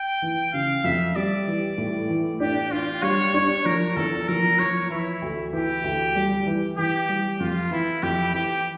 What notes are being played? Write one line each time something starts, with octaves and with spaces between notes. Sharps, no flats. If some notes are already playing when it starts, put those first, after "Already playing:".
Already playing: G5
E3
C#3 F5
F2 E5
G3 D5
E3
A2
E3
D4 G4
D4 F4
G3 C#5
D4 C#5
F3 A#4
E2 A4
F3 A#4
F3 C#5
E3 E4
D2
E3 G4
D2
G3
E3
E3 G4
G3
F2 F4
E3 E4
F2 G4
E3 G4